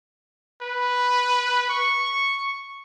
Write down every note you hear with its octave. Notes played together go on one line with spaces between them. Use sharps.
B4
C#6